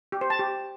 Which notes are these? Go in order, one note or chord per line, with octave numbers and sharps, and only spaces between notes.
G4
C5
A5
G4